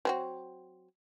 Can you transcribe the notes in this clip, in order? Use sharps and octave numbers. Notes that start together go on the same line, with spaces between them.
F#3 C4 F#4